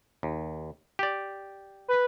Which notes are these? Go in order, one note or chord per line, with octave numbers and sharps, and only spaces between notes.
D#2
G4 D5
B4